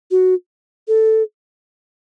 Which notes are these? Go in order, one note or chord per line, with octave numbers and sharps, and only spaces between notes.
F#4
A4